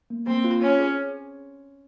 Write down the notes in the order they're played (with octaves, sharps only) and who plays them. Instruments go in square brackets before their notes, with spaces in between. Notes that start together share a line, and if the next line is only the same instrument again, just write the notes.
[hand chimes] A#3
[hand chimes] A#3 [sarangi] C4
[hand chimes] F4
[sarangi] C#4 [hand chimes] C#5
[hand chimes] G#4